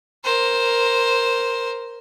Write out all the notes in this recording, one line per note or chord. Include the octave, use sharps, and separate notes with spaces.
A#4 C5